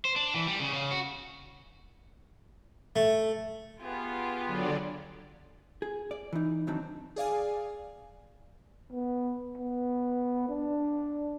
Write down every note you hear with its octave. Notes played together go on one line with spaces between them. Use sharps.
C5
D4
E3
G3
C#3
C#3
F#4
A3
B3 F4 G4 G#4
D3 F#3 D5
G#4
D5
E3 D#4
D#3 E3 F#3 C4 D4 D#4
G#4 D5 F5 G#5
B3
B3
D4